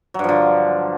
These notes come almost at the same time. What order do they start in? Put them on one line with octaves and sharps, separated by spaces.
F#3 G2 F3 D3